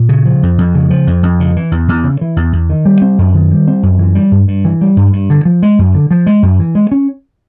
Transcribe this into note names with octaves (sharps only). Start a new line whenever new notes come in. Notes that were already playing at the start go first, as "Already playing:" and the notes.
Already playing: A#2
C#3
F3
F2
F2
C#3
F3
F2
F2
C#3
E3
E2
E2
C#3
E3
E2
E2
D#3
G3
C4
F#2
D#3
G3
C4
F#2
E3
G3
G2
G2
E3
G3
G2
G2
D3
F3
G#3
F#2
D3
F3
G#3
F#2
E3
G#3
C#4